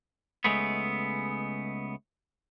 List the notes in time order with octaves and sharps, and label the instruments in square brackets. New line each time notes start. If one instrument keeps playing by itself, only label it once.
[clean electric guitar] C#2 G#2 G#3 A3 B3